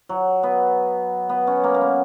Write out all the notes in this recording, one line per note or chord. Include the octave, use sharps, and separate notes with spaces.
F#3
B3
B3
C#4
A#3
A#3
B3